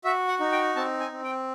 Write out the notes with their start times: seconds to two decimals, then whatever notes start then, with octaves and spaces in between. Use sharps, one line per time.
0.04 F#4 E5
0.28 F#5
0.40 D#4
0.52 G5
0.76 C4 A5
1.00 G#5
1.12 C4
1.24 G5